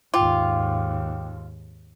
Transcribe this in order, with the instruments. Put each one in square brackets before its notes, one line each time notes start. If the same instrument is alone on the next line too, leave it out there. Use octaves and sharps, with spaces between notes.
[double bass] D#2 G#2 [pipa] F4 [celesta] G5 D6